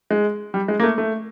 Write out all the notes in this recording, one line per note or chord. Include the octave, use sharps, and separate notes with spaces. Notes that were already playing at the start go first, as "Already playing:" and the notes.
G#3
G3
G#3
A#3
A3
A3